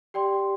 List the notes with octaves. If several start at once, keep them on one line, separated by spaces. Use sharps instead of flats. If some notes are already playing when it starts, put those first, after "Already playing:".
G4 D5 G5 C6